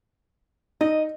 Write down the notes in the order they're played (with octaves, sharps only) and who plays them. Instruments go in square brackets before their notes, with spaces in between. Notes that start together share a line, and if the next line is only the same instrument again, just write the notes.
[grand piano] D#4 [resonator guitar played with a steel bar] D#5